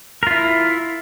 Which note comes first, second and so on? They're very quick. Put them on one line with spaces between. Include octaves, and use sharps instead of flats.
A#4 F4 E4